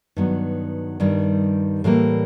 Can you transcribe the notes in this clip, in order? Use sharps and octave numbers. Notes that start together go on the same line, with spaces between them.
G2 D#3 F#3 B3
G2 D#3 G3
A2 E3 G3 A#3